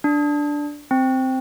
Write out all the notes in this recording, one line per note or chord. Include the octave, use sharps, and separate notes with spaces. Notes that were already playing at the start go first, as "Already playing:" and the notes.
D4
C4